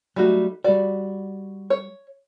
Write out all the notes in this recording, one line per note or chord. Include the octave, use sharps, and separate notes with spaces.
F#3 G3 A3 D#4 F#4
G3 F#4 D5
C#5